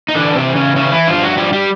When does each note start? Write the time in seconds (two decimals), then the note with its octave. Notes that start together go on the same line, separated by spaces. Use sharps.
0.08 D#4
0.15 D3 E3 D4
0.35 C3 C4
0.46 E3
0.56 C#3 C#4
0.76 C#3 E3 C#4
0.92 E3 E4
1.07 G2 F3 F4
1.23 F#3 F#4
1.37 F3 G3 G4
1.53 G3 G4